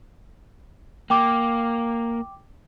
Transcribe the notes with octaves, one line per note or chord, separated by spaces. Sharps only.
A#3 G5 D6